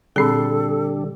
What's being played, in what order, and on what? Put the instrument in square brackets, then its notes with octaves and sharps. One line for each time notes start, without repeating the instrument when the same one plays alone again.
[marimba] A#2 C4 G#4 [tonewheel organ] D3 G3 [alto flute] A4